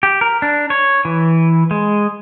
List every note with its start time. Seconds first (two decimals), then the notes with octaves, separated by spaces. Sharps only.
0.03 G4
0.21 A#4
0.42 D4
0.70 C#5
1.05 E3
1.71 G#3